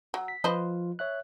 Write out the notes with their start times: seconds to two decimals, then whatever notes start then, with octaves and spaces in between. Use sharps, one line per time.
0.14 F#3
0.28 B6
0.44 F3 F4 B4 C5 D#5
0.99 C#5 E5 F#6